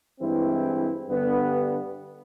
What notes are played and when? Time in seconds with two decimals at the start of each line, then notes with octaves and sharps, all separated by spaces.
0.20 G2 E3 G#3 C4 E4
1.07 G2 D3 G3 B3